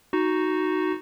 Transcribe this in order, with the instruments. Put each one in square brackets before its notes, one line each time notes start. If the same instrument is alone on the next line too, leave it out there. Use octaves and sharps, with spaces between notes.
[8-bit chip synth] D#4 F#4